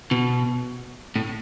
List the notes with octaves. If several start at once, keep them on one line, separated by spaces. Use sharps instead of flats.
B2
A2